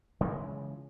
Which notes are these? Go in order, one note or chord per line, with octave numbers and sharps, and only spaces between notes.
C#3 E3 F3 G#3